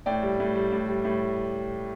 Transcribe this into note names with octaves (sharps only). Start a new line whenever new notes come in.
A2 D5 G5
G3
A2
G3
A2
G3
A2